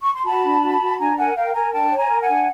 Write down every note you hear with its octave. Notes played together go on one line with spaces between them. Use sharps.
C#6
C6
F#4 A5 B5
D4
F#4
F#4
D4 G#5 A#5
A#4 F#5 G#5
A#4 F5 G5
A#4 G#5 A#5
D4 G5 A5
C#5
G#5 A#5
A#4
F#5 G#5
D4